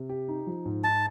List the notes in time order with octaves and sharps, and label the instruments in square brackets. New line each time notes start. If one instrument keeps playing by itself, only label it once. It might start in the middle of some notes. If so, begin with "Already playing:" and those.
Already playing: [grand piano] C3
G4
D#4
F3
G#2
[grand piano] D#4 [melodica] A5